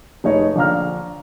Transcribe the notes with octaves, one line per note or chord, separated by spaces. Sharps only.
F1 D#4 G#4 C#5 D#5
A#1 D3 D4 F5 A#5 F6